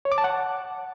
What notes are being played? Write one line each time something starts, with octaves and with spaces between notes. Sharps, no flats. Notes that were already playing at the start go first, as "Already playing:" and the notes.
C#5
D6
A5
F#5